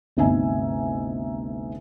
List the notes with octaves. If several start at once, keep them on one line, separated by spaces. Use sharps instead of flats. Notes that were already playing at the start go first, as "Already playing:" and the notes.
G1 D2 C3 D#4 E5 G#5